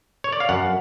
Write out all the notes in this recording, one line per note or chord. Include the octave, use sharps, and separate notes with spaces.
C#5
D5
F5
F#2 F#5